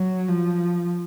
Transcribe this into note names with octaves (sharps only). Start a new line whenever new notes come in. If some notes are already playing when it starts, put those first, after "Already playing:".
Already playing: F#3
F3